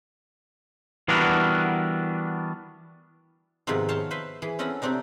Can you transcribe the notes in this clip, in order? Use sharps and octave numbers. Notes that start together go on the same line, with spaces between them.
E3 G3 B3 D4 F#4 A#4
G#2 C3 D#3 F3 B3 C4
C5 C#5 F5 A5 C6
B4 C5 E5
E3 G#4
C4 C#4 A4 D#5 F#5 B5
C3 A3 C4 D4 D#4